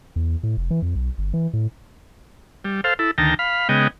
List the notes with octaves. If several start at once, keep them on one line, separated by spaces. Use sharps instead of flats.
E2
A2
F1
E3
F2
B1
G1
E3
A2
G3
A4 C5 F5
E4 A4
D2 D#3 G5 A5 A#5
F5 B5
C#3 G#3 B3 D#5 G5